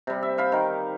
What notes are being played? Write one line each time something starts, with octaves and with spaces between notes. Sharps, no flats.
C3 G3
E5
C5 F5 B5
D#3 A#4